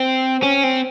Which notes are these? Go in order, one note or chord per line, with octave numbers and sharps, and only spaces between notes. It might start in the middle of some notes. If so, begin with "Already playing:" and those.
Already playing: C4
C#4
C4